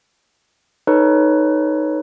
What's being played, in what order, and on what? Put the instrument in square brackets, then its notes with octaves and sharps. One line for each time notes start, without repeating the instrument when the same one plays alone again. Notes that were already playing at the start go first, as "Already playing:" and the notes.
[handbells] D#4 A4 B4 C#5